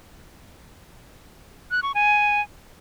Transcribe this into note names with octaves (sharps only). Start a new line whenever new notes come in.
F#6
C#6
G#5